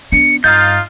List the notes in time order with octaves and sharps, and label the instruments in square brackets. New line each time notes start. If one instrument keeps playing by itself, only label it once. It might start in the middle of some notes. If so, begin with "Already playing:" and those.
[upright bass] B3 D4 [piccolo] C#7
[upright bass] G2 [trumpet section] D#4 F4 F5 [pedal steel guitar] G6 [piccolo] A6